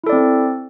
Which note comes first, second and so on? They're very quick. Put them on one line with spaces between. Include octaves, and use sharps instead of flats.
E4 A4 D5 C4